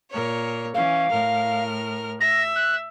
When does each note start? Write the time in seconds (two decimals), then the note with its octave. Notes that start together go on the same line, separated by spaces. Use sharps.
0.11 A#2 A#4 C#5
0.75 E3 C#4 F5
1.10 A2 A#4 F6
2.21 E5 A#6
2.56 F#6